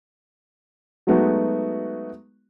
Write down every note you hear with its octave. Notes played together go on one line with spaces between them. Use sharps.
F#3 G#3 A3 B3 D#4 F#4